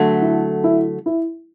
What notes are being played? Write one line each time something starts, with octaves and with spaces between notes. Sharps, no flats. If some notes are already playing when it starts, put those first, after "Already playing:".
Already playing: D3 F#3 A3
E4
E4
E4